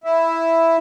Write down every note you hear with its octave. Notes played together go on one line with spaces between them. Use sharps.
E4